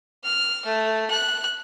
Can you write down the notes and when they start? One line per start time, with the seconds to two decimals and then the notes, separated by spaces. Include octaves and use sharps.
0.24 F6
0.66 A3
1.11 F#6